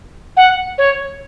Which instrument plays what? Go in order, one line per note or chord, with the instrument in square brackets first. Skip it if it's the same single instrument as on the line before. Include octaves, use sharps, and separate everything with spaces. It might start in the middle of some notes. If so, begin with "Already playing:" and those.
[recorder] F#5
C#5